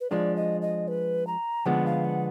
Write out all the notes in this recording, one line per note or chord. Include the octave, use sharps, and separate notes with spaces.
B4
F3 G#3 D4 D5
D#5
D#5
B4
A#5
D3 F3 G#3 B3 F#5
F5
F#5